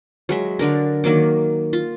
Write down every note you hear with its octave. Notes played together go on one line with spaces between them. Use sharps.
F#3 G#3 E5
D3 D4 A#4
D#3 F#3 A#3 D6
F4